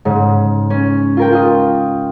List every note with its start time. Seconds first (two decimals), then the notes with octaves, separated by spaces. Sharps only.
0.05 G#2 C#3
0.70 C#4
1.17 F4 A#4 G5
1.32 F4 D#5